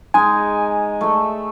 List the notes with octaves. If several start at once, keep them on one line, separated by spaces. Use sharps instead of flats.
G#3 D#4 G#5
A3 E5